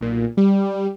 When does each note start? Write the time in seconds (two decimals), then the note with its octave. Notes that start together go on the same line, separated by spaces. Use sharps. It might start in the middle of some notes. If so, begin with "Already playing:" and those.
0.01 B1 A#2
0.37 G3